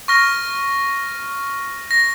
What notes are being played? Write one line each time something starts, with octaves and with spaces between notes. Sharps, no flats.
C#6 F6 A#6
A#6